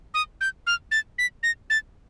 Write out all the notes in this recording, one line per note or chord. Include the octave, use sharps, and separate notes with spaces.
D#6
G6
F6
A6
B6
A#6
A6